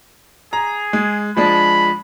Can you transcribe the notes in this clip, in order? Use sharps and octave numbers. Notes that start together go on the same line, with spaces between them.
G#4 A#5
G#3
F3 G#3 D4 B5